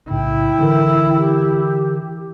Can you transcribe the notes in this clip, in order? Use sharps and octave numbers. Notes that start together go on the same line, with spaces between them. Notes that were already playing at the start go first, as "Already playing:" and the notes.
B1 A2 C#3 E4 G5
D3 E3 A#4
G4